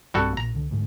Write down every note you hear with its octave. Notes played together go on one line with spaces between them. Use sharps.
B1 G2 G3 C4 F#4 A4
A#1 A#2 A#5
C#2 D3
D2 G#2 G#3